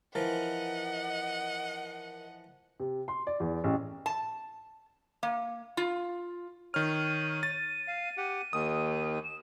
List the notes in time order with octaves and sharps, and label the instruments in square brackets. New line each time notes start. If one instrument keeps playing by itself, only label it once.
[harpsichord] E3 F3 [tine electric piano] A#4 [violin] D#5 F#5
[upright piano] C3
C6
D5
E2
A1
[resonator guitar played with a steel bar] A5
A#3
F4
[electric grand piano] D#3 F6 [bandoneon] C#5 [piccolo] D#7
[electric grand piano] A6
[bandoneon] F5
G4 F#5
[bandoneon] D#2 D#3 [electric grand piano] D#6
[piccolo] E7